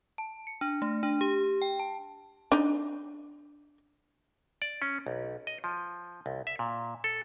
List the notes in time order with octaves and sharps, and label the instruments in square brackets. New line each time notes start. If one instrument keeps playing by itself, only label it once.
[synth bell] A5
C#7
D4
A3
D4
G4
G5
A5
[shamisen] D4 D#4
[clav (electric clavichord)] D5
C#4
B1
D#5
F3
C2
E5
A#2
A4